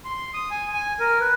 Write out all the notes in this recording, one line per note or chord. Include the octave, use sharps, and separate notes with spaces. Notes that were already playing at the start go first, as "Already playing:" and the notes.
C6
D#6
G#5
G#5
A#4
B4